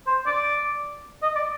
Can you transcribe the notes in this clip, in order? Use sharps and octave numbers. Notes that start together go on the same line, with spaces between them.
C5
D5
D#5
D5